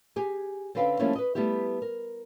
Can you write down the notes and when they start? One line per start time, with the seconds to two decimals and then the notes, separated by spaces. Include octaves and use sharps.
0.16 G4 G#4 G#5
0.75 D3 C4 C#4 B4 F5 G5
0.99 F3 G3 A3 A#3 C#4 E4
1.16 B4 D#5
1.35 G3 A3 B3 E4 G4
1.82 A#4